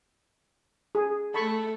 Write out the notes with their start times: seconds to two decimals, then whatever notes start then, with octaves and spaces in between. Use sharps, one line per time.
0.95 G#4
1.34 A3 A4 A5 B5 C#6